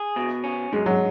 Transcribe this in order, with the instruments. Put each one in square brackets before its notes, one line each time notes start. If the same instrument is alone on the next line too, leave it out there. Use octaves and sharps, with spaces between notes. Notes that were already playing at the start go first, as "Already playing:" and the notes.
Already playing: [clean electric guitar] G#4
B2
C#4
[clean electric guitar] F#2 [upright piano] G#3
[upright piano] F#3